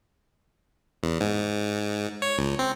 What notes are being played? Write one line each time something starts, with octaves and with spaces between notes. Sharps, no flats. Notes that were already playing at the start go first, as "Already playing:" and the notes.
E2
G#2
C#5
C#2
C4